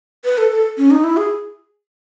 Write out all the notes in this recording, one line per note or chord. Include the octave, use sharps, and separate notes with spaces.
B4
A4
A4
C#4
D#4
E4
G#4